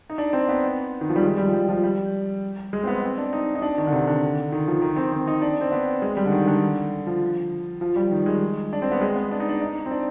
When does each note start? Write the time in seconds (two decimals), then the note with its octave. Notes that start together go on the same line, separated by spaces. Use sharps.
0.10 D#4
0.18 D4
0.33 C4
0.49 B3
1.01 D#3
1.09 F3
1.16 G3
1.22 G#3
1.37 G3
1.48 F3
1.53 G3
1.68 F3
1.83 G3
2.73 G#3
2.83 C4
2.87 B3
3.03 C4
3.18 D4
3.33 D#4
3.55 D#4
3.62 D4
3.78 D#3
3.87 D3
3.92 C3
4.07 D3
4.52 D#3
4.67 F3
4.82 D#3
4.97 C4
5.12 C4
5.27 D#4
5.42 D4
5.61 C4
5.72 B3
6.02 G#3
6.17 G3
6.26 D3
6.32 D#3
6.47 D3
7.07 F3
7.81 F3
7.96 G3
8.11 D#3
8.26 G#3
8.73 D4
8.82 C4
8.92 B3
9.01 G#3
9.16 B3
9.31 D4
9.40 D#4
9.49 D4
9.61 D#4
9.86 C4
9.91 D4